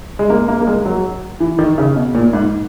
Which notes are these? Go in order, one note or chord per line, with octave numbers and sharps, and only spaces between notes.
G#3
A#3
A#3
A#3
G#3
F#3
E3
D#3
C#3
B2
A#2
G#2